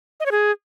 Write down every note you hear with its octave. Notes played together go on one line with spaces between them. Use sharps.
D#5
C#5
G#4